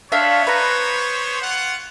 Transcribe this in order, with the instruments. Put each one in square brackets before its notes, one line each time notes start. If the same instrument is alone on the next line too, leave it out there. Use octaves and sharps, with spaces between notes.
[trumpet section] B3 C5 C#5 [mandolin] D4 E5 F5
[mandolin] B4 A#5
[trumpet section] F4 F#5